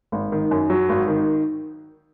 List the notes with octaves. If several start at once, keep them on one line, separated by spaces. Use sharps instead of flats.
G#1
D#3
F#2
F#3
G#1
D#3